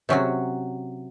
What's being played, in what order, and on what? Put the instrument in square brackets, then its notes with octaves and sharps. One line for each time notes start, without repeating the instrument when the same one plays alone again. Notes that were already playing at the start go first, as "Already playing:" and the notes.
[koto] C3 F#3 C#4 F#4